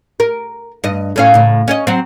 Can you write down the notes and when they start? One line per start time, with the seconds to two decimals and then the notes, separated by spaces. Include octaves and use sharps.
0.20 A#4
0.84 G2 D#5
1.16 A2 C#4 F5
1.34 A2 C#3
1.68 C#4 C#5 D#5
1.87 F#3 C4